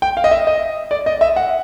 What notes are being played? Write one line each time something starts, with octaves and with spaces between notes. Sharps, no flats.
G5
F5
D#5
E5
D#5
D5
D#5
E5
F#5